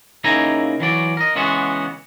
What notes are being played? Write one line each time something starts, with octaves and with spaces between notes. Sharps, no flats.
C#3 A#3 D#4 E4 G#5 A#5
E3 F#3 D5
A#4 D#5
C#3 E3 G#3 B3 F#4